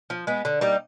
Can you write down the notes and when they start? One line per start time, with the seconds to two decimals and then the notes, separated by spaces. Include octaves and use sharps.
0.10 F3
0.27 G#3 B3
0.45 D3
0.61 G3 A#3 D#4